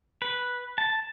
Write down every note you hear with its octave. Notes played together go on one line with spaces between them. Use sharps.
B4
A5